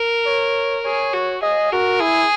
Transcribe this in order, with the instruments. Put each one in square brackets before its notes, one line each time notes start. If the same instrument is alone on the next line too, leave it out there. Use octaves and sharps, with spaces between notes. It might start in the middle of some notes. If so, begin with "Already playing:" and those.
Already playing: [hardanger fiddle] A#4
[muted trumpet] C#5
[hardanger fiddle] G#4 [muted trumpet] C#5
[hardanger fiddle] F#4
[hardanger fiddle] G#4 [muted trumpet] D#5
[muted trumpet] F#4 [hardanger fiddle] A#4
[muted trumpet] E4 [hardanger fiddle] G#4